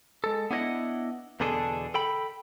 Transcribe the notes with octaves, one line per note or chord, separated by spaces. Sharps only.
G#3 A4
B3 D4 E4 C5 D#5 F#5
E2 B2 D3 D4 G#4 A4
A4 G5 B5